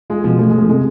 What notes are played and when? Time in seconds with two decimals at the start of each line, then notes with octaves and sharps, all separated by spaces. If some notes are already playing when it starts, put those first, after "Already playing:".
0.10 G#3 F4
0.24 B2 F3
0.39 F3 A3
0.49 G#3 A3
0.58 F3
0.68 C3 G#3